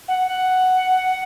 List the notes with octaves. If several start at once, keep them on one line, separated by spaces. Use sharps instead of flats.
F#5
F#5